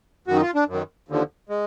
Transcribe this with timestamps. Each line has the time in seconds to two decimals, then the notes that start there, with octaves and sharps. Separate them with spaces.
0.27 F#2 D#3 F#4
0.36 D#4
0.41 F4
0.55 D4
0.68 F#2
0.73 D#3
1.08 D#2 D3 F3
1.49 G#3